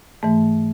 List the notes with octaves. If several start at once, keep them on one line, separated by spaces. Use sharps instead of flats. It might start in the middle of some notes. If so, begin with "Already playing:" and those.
G#2 E3 A3